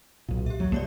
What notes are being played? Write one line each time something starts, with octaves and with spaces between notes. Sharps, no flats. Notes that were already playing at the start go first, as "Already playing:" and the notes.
B1 A#2
G4 E5
D#2 F#3
C2 A#3 C#5 D5